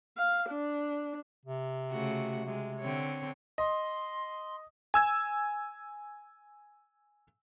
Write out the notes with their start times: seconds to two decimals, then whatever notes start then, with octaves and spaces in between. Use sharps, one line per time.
0.18 F5
0.50 D4
1.45 C3
1.91 C#3 A3 F#4
2.46 C3 G#3
2.80 D3 C4 C#5
3.58 D#5 C6
4.94 G#5 E6 G#6